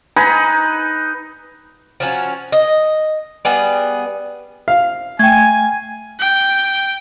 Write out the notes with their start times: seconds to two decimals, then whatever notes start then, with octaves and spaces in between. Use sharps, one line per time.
0.16 D#4 B4 G#5 B5
2.00 F3 F#3 C#4
2.52 D#5
3.45 G3 B3 G#4
4.68 F5
5.19 A3 G5 G#5 G#6
6.20 G5